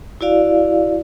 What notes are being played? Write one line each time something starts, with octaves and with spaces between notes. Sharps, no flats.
E4 F#4 D5 F5